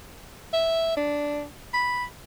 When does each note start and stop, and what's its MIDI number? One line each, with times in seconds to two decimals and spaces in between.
0.53 0.94 76
0.97 1.44 62
1.74 2.04 83